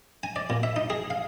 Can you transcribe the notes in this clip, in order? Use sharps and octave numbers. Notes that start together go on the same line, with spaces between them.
G#5
D5
A#2
E5
D#4
G#4
F5